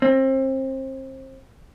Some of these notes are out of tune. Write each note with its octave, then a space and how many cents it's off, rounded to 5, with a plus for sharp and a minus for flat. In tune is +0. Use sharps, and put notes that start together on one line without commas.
C4 +30